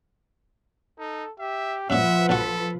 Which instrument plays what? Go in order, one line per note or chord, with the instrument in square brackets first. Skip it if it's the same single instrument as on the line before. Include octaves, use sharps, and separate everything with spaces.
[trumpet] D#4 [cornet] A4
[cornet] G4 [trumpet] E5
[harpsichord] F#2 A#2 [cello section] F3 F4 B4 [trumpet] E5 [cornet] F#5
[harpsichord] A#1 F#4 [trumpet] A4